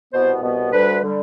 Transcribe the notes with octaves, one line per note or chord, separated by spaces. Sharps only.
C2 B2 B3 C5
C2 B2 B3
D2 D3 G3 B4
D3 G3